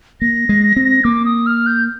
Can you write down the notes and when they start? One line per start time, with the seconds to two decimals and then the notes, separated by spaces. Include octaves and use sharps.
0.21 A#3 A#6
0.49 G#3
0.76 C4
1.04 A#3 D6
1.25 D#6
1.46 F6
1.67 G6